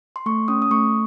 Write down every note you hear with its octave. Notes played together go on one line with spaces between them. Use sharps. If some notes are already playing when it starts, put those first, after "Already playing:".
C6
A3 C#6
C#4 D#6
D#6
A3 C#6